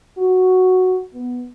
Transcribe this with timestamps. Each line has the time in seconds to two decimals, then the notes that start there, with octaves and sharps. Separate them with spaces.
0.18 F#4
1.14 B3